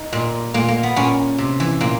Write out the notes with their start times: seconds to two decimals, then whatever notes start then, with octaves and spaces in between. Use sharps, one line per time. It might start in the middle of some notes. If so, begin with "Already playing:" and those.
Already playing: D#4
0.13 A#2
0.54 A#2 A#3
0.68 A#3
0.83 B3
0.96 A#2 C#4
1.38 C3
1.60 E3
1.81 A#2 A#3